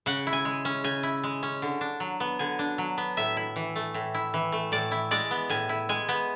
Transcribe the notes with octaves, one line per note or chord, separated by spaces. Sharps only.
C#3 F#5
E4
G#5
G#3
C#4
C#3 G#5
E4
G#3
C#4
D3
D4
F#3
B3
D3 G#5
D4
F#3
B3
A2 E5
E4
E3
A3
A2
E4
E3
A3
A2 D5
E4
G#3 D5
B3
A2 G#5
E4
G#3 G#5
B3